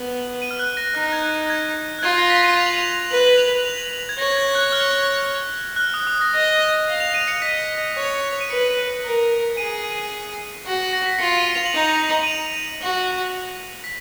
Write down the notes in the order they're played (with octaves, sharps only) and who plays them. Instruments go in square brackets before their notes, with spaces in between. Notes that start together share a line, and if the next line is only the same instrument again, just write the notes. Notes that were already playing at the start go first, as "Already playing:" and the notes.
Already playing: [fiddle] B3
[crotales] D#7
F6
F#6
A#6
[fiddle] D#4 [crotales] F#6
[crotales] G#6
F#6
G#6
F#6
[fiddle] F4 [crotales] G#6
[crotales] A#6
B6
D#7
F7
F#7
F7
[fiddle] B4 [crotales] F#7
[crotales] F7
F7
F#7
F7
G#6
[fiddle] C#5 [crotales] A#6
[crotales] G#6
F#6
F6
F#6
F6
D#6
D#6
A#6
[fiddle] D#5 [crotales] A#6
[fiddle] F5
[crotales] F7
D#7
C#7
[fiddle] D#5 [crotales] B6
[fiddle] C#5
[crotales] D#7
[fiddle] B4 [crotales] C#7
[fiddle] A#4
[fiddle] G#4 [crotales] D#7
[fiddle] F#4
[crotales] A#6
B6
[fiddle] F4 [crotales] C#7
[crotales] D#7
F7
F#7
[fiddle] D#4 [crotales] F7
[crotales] D#7
F7
[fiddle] F#4
[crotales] B6